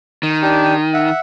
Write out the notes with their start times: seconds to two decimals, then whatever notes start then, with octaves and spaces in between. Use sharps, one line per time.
0.23 D#3
0.42 D4 G4
0.94 E5 F#5